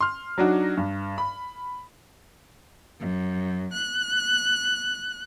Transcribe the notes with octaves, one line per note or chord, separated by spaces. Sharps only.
C6 F6
F#3 D4 D#4 F#4
G2
B5
F#2
F#6